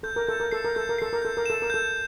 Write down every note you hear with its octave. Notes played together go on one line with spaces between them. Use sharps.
A4 G6
A#4
A4 G6
A#4
A4 C7
A#4
A4 G6
A#4
A4 C7
A#4
A4 G6
A#4
A4 E7
A#4
A4 G6